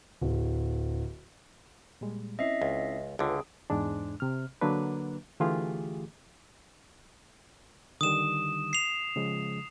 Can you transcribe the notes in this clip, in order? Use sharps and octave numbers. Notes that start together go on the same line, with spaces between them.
D1
A#2 G3 G#3
C4 C#4 E4 D#5 E5 C7
C#2
C#2 D3 G#3 F4 G#4 B4
E2 G#2 G#3 D4
C3 F6
D3 F#3 A#3 D4 B4
D3 E3 A3 F4 G4 G#4
D3 D#3 G3 D#6 E7
C7 F7
C#3 F3 G#3